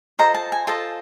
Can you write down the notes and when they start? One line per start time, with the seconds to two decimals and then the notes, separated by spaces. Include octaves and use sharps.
0.19 F4 A4 C5 D#5 A#5
0.34 A5
0.52 G#5
0.67 F4 A4 C5 D#5 A5